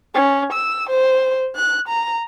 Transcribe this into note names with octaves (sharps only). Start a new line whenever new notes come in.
C#4
E6
C5
F#6
A#5